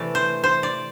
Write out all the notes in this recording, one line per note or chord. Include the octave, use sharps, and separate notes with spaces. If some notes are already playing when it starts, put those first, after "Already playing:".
Already playing: C3 E3 A3 D5
C5
C5
D5